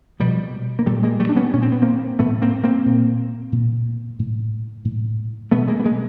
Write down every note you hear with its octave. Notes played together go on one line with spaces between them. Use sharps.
B2 F3 G3
A#3
A#2 G3 A3
G#3 A#3
G3 A3
D4
B3 C#4
A#2 C#4
C4
B3
A#3 C4
A2 A3 B3
A#3 C4
A#3 C4
A#2
A#2
A2
A2
B2 A3 B3
G#3 A#3
B3
G#3 A#3